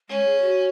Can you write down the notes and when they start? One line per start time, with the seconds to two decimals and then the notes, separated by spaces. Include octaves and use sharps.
0.09 G#3 C#4
0.25 G#4
0.42 F#4